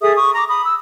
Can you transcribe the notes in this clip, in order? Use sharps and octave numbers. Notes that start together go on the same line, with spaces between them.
G#4 A4 E5 D#6
C#6 D#6
A#5 D6
B5 D#6
E6